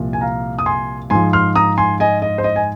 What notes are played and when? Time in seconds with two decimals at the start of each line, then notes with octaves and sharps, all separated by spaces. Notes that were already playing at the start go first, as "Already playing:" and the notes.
Already playing: C2 A#2 F3
0.13 G#5
0.21 F5 A#5
0.59 D#6
0.66 G#5 C6
1.10 G#2 F3 G#5 C6
1.33 C6 F6
1.56 A#5 D#6
1.78 G#5 C6
2.00 D#5 G#5
2.22 D#5
2.38 C5
2.44 D#5
2.56 G#5